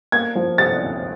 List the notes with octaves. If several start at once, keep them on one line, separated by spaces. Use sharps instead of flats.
A#3 G#6
F3
C3 A6
D2